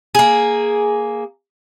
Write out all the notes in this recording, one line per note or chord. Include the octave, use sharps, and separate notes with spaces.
A#3 G#4